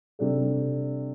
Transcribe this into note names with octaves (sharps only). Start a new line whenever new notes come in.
C3 G3 D4 A4